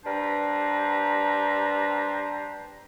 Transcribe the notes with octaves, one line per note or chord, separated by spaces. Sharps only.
G3 D4 B4 C5 A#5